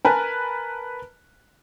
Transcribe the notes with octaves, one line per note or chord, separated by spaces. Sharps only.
A#4 B4 G#5 A5